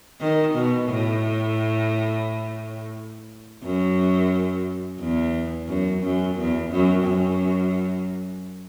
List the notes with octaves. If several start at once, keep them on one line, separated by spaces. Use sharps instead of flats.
D#3
B2
A2
F#2
E2
F#2
F#2
E2
F#2
F#2